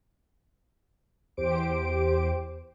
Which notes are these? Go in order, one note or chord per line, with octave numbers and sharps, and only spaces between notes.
E2 G4 C5 D6 D7